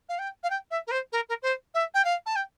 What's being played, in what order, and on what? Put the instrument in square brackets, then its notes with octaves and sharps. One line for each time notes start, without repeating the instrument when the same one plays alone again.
[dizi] F5
G5
F5
G5
E5
A#4
C5
A#4
A#4
C5
E5
G5
F5
A5
G5